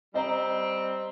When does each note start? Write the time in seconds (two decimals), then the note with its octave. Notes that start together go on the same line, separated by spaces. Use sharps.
0.14 G3 C4 D#5 A#5